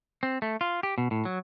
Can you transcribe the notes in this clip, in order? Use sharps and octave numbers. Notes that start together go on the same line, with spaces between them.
C4
A3
F4
G4
B2
A2
F#3